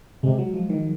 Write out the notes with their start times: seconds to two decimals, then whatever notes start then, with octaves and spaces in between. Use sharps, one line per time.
0.23 C3 G#3
0.39 F#3
0.54 F3
0.70 D#3